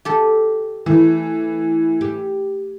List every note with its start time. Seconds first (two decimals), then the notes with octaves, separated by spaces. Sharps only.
0.05 G4 A4
0.86 E3 A3
2.01 G4